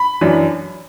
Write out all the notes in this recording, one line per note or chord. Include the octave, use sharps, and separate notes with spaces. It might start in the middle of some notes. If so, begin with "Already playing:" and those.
Already playing: B5
F#2 E3 D4